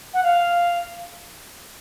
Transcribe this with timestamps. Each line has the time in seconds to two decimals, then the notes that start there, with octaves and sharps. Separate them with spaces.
0.14 F#5
0.23 F5